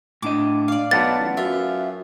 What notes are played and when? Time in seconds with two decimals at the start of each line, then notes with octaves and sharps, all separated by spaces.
0.22 A2 D4 D#5 D6
0.68 D5 F5
0.91 B1 B4 F#5 A5 A6
1.20 A1
1.37 F#2 F4 E5